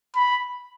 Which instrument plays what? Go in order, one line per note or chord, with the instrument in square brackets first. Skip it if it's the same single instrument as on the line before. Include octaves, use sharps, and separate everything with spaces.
[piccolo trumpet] B5